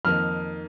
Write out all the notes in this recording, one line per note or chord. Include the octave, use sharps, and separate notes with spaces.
F2 D#3 A#3 D#4 F6